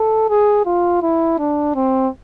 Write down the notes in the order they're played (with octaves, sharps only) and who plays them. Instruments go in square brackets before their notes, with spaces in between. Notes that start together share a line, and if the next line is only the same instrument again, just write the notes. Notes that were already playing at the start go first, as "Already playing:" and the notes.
Already playing: [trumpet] A4
G#4
F4
E4
D4
C4